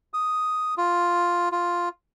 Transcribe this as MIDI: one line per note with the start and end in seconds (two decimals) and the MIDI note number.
0.14 0.74 87
0.78 1.49 65
1.52 1.89 65